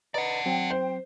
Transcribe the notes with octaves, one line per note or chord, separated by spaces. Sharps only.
B4 D5 D#5 F#5 A#5
F#3 C4 G5
C5